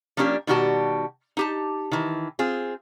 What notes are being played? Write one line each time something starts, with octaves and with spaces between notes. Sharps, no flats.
F3 A#3 C#4 D4 G4
B2 D#3 G3 F#4 G4 A5
D#4 G4 A5
D#3 E3
C4 F4 G#4